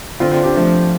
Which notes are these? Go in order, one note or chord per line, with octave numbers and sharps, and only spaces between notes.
D3 C4 F4
C4 F4
D4 G4
F3 A3 D4